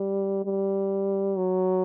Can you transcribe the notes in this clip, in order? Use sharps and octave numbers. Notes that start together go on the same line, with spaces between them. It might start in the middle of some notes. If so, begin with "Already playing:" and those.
Already playing: G3
G3
F#3